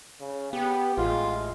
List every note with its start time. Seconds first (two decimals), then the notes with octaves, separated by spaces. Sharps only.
0.20 C#3
0.53 B3 G4
0.98 A1 G#3 F4